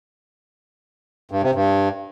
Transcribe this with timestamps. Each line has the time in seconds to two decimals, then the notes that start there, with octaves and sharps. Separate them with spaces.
1.31 G2
1.43 C3
1.55 G2